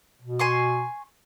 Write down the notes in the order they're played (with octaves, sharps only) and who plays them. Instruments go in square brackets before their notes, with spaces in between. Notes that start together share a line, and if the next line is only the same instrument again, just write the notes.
[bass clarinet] B2
[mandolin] G#5 C6 C#6